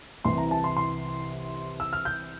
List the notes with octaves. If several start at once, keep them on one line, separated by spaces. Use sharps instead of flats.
C2 C3 E3 C6
A#5
A5
C6
C6
E6
F6
G6